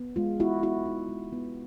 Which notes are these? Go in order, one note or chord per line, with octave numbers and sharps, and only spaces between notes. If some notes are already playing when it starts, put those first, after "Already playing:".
Already playing: B3
G#3 F4
B3 E4 F#4
B3 E4 F#4
D#4
G#3
B3